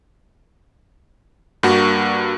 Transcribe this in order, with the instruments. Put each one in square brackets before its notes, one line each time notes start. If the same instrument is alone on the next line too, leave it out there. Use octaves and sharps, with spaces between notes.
[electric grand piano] G2 A#3 F#4